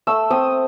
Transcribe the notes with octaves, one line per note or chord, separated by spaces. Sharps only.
A3 E6
C4 D#6